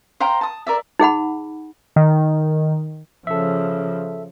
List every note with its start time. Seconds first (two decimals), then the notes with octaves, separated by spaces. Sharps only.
0.20 C5 F5 G5 A#5
0.41 A5 D#6
0.67 A#4 D5 E5
0.99 D#4 G#4 F#5 B5
1.96 D#3
3.27 C#3 F3 A4 E5